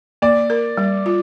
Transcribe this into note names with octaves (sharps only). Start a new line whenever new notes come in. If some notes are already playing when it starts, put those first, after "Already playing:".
A#3 D5
A#4
G3
F4